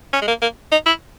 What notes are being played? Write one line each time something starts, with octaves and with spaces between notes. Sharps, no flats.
C#4
G#3
A#3
A#3
D#4
E4